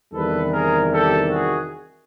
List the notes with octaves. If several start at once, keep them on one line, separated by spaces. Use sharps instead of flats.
E2 C3 D#3 G3 A4 B4
G#4 A#4
G4 A4
F#4 G#4